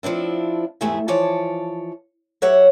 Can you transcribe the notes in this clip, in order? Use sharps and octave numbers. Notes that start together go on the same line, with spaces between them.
F3 C4 D4 E4
E2 G#2 A3 G4 G#4 E5
E3 F3 C#5 D5 A5
F#3 G4 C#5 E5 F#5